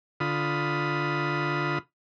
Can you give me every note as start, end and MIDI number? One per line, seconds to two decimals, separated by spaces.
0.20 1.78 50
0.20 1.78 65
0.20 1.78 83
0.20 1.78 87